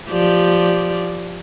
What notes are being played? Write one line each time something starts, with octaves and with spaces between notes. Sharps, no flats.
F3 G4 D5